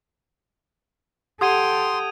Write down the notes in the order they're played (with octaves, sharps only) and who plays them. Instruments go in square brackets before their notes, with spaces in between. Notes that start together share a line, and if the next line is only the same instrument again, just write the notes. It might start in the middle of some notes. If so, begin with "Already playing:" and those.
[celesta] G4 F#5 [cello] A4 G5 [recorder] C6 [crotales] D#6 G#6 D#7